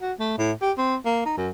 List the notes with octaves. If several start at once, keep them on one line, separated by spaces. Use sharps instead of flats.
F#4
A3
A2
G4
C4
A#3
D#4
F#2